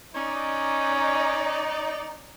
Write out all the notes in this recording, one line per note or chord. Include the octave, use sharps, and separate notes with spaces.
C#4 D#4 D5